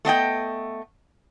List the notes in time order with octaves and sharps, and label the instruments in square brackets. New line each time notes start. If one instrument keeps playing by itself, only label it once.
[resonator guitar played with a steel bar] A3 B3 D#5 G5